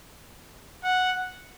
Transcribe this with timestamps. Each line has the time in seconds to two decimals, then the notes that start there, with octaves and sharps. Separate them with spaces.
0.84 F#5